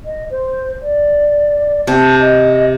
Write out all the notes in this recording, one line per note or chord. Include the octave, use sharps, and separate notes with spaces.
D#5
C5
D5
C3 A5
D#5